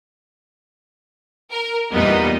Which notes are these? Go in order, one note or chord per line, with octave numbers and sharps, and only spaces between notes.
A#4
E2 A#2 G3 B3 D#4 D#5